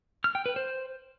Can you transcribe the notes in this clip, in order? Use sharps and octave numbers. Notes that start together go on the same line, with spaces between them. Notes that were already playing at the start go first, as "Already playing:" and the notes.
F6
G5
B4
C5